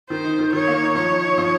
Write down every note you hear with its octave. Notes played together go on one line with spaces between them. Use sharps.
D#3 C5
D#4
D#3
D#3 C#5
A#3
D#4
F3 C#5
D#4
D#4
F3